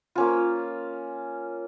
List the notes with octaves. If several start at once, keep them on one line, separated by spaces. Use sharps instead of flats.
A#3 C#4 F4